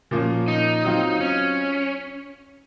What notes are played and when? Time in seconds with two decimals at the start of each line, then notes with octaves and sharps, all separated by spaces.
0.11 A#2 F3 A#3 C#4
0.48 D#4
0.85 F#3 C4 F4
1.20 C#4